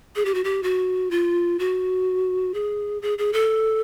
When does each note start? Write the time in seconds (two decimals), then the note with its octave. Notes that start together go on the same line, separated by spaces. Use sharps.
0.16 G#4
0.25 G4
0.35 F#4
0.44 G4
0.63 F#4
1.11 F4
1.59 F#4
2.54 G#4
3.02 G#4
3.18 G#4
3.33 A4